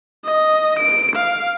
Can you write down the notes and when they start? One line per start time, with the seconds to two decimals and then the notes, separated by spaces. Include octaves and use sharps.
0.25 D#5
0.79 D7
1.16 F5